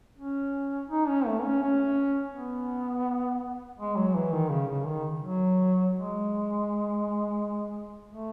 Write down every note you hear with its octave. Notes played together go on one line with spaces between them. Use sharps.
C#4
D#4
C#4
A3
C#4
C#4
B3
G#3
F#3
E3
D#3
C#3
C#3
D#3
F#3
G#3
A3